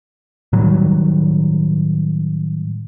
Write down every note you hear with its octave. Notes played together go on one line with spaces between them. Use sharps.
A2 D#3 F#3 G3